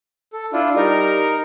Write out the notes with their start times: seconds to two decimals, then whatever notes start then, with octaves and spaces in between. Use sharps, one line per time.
0.33 A4
0.53 D4 E4 F4
0.76 G3 D#4 A#4